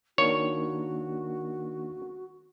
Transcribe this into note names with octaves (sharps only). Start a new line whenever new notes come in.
D#3 A#3 D4 F#4 C#5